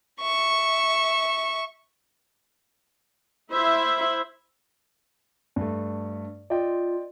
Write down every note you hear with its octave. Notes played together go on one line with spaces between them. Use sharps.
E5 C#6
E4 C5 E5
G2 A3
F4 D5 D#5 G5